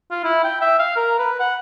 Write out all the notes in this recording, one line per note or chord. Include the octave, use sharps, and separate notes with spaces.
F4
E4
G5
E5
F5
A#4
B4
F#5